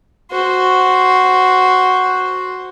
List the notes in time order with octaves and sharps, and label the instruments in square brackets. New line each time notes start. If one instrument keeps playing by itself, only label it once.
[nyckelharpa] F#4 C5